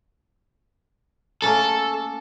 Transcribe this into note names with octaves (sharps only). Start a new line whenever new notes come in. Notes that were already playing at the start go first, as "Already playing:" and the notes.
A3 A#3 C#4 A4